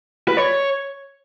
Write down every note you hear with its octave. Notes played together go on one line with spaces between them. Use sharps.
B4
C#5